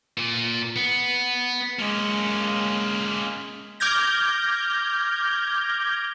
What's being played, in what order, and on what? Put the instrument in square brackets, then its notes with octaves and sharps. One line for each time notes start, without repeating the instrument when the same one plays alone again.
[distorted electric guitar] A#2
B3
[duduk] G#3 [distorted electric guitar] A#3 C#4
[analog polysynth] D6 F6 G6 G#6 A#6